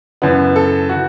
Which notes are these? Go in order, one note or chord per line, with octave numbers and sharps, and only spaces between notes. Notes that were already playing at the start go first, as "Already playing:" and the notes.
F#2 C#3 E3 B3
A4
C#3 E3 F#4